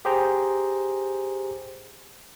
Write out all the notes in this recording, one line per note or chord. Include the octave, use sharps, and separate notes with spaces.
G4 G#4 C5 G5 A#5